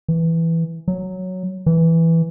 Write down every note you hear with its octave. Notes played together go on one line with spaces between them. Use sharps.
E3
F#3
E3